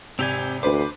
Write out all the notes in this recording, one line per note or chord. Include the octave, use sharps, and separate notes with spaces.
G#1 C3 C4 G4 G#5 F7
D2 D4 B4 C5 D6